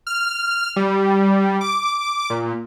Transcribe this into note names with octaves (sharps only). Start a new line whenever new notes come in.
F6
G3
D6
A#2